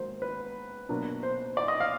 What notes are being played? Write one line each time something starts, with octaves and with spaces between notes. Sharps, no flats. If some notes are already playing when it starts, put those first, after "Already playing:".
Already playing: G#2 D#3 F#3 A#3 C5
B4
B2 F#3 A#3 D4
C5
D5
D#5
F5